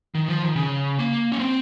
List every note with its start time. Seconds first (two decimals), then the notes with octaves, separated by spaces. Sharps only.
0.15 D#3
0.28 F3
0.42 D#3
0.56 C#3
0.99 A#3
1.32 C#4
1.39 C4